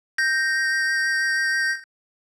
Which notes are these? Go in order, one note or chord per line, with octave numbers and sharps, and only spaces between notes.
G6 A#6